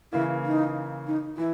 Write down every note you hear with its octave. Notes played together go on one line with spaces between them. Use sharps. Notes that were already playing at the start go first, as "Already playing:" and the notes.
C#3 E3 A#3 E4
D#4
D#4
E3 E4